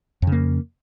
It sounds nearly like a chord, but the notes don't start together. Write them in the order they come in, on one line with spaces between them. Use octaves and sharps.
F2 C#3 A#3